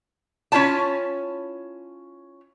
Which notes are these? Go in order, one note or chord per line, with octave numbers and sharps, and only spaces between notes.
C#4 E4 F4 C#5 A5